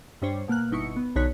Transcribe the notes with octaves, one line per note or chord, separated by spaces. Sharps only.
G2 G3 D4 C5 C#5
B2 A#3 F6 F#6
G1 B2 D#4 E4 C#6 C#7
B3
B1 D3 D#4 C#5 F#6 B6